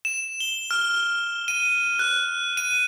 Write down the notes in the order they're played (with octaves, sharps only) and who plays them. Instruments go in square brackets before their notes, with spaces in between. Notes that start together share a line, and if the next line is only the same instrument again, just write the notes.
[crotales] E7
G7
F6
D#7
F#6
D#7